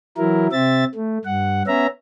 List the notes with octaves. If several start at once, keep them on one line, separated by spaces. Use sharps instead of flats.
E3 F#3 E4 A#4
C3 C4 E5 A6
A3
G2 F#5
B3 C#4 E5 A#5